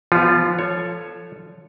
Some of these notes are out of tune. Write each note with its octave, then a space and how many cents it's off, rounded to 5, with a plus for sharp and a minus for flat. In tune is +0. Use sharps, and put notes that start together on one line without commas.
F3 -20 B3 +0 F4 +15
A4 +0 C#5 +0